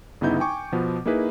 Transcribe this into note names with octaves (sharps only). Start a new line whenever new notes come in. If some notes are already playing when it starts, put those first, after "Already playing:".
G1 C#3 B3 D#4 E4 G6
G5 G#5 C#6 D6
B2 F3 B3
A#3 D#4 E4 G#4 B4